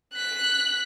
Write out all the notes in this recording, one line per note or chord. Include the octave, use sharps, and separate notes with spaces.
F#6 B6